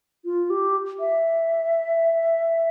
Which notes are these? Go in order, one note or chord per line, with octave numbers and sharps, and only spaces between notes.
F4
G4
E5